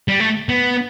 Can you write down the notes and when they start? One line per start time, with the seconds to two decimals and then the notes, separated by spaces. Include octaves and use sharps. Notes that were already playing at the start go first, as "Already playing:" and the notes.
0.08 G3
0.20 A3
0.49 B3